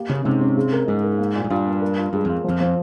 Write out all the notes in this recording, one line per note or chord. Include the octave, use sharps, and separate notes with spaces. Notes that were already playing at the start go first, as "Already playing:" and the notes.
Already playing: A#3 G4
C#3 C#4
G#2 C3
C#4
C#3
A#4
G#2 D#4
A#4
A#3
A#2
G#2
G2 F4
A#3
A#4
F4
G2 G#3
F2 F4
F2 F3
F3